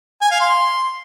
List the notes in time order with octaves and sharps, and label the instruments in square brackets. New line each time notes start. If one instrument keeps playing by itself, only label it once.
[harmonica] G#5
F5
C6